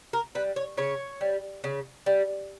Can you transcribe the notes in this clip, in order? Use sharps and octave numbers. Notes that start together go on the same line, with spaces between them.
A#4
G3 B4
C#5
C#3 C#5
G3
C#3
G3